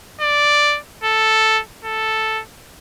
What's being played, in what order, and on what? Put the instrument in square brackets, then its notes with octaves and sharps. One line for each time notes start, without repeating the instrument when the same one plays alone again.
[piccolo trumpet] D5
A4
A4